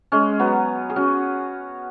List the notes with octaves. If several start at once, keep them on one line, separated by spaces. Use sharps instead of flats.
G#3 C#4
F#3 B3
G#4
C#4 F#4